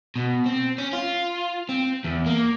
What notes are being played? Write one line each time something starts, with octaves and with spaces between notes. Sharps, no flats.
B2
C4
C#4
F4
C4
E2
A#3